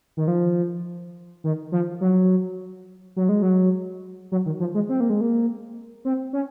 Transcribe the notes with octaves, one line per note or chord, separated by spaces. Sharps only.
D#3
F3
D#3
F3
F#3
F#3
G#3
F#3
F#3
D#3
F3
G#3
C4
A#3
G#3
A#3
C4
C#4